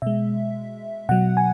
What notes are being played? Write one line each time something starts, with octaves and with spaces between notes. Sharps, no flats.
B2 G#3 E5
B2 F#3 F#5
G#5